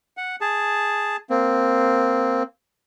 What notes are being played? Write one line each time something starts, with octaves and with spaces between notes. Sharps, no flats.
F#5
G#4 A5
A#3 C4